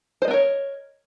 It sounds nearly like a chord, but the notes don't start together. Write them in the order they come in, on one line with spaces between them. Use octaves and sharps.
C5 D#5 B3 A#4 C#5